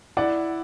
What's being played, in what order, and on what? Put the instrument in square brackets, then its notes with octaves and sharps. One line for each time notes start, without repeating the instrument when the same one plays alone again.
[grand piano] E4 [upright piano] D5 F#5